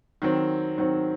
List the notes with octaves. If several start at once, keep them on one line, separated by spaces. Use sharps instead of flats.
D#3 F#3 C4
D#3 F#3 C4